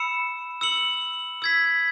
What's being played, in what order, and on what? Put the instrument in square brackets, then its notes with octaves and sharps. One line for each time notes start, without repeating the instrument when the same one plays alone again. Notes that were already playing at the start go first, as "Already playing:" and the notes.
Already playing: [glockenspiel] B5 E6 C#7 E7
E6 C#7 F#7
E6 G#6 B6